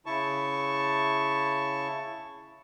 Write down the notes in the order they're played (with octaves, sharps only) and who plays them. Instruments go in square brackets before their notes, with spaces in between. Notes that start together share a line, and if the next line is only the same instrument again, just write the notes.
[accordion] C#3 E4 A5 C#6